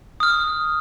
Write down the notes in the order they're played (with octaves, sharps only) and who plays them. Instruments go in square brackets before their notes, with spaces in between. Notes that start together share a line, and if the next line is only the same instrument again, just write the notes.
[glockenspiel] D#6 F6